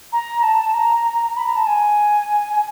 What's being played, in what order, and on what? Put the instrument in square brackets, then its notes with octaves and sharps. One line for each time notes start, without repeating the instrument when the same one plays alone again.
[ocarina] A#5
A5
A#5
B5
A#5
A5
G#5
G#5